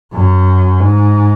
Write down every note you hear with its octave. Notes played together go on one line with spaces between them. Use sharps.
F#2
G#2